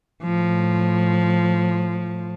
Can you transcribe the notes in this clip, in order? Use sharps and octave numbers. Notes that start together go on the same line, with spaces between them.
A2 F3